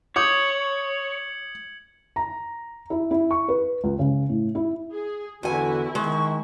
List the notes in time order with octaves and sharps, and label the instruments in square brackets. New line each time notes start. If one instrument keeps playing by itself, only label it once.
[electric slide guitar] C#5 [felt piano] D6 D#6 G6 [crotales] G#6 C#7 F#7
[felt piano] A#5
E4
E4
C#6
B4
C#2
C#3
A2
E4
[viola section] G#4
[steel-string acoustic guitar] E2 G#5 [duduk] D3 [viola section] E4 [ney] F#4
[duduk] D#3 [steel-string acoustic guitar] G#3 [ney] C#6